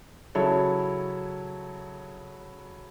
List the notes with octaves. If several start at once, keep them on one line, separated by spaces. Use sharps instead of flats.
C#3 F#3 E4 A4 C#5